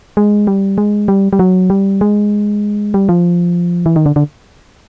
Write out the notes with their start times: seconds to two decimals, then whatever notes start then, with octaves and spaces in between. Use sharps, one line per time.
0.17 G#3
0.47 G3
0.78 G#3
1.08 G3
1.33 G3
1.39 F#3
1.70 G3
2.01 G#3
2.94 G3
3.09 F3
3.86 E3
3.96 D#3
4.06 D3
4.16 D3